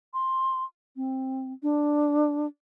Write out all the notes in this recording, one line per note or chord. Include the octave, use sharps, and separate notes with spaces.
C6
C4
D4